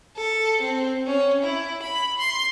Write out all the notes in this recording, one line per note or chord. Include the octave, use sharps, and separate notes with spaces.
A4
C4
C#4
E4
B5
C6